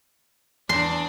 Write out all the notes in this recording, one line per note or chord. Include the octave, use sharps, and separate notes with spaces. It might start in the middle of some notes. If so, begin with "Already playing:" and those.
E2 D4 D5 C6